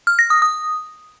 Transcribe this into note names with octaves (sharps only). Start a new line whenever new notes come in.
F6
A#6
D#6
D#6